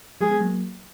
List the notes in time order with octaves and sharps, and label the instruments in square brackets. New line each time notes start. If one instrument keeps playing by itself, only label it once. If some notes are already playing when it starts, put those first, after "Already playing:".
[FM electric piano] F3 G#3 [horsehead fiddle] G#4
[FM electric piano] G#3 B3
F#3 A#3